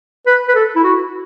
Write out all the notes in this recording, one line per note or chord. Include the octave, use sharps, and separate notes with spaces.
B4
B4
A4
E4
F#4